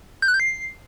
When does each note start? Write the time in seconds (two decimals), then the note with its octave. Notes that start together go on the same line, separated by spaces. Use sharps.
0.22 G6
0.28 F#6
0.34 G6
0.40 C7